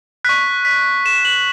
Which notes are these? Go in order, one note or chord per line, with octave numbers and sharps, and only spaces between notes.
C#6 F#6 B6
B6
E7
F#7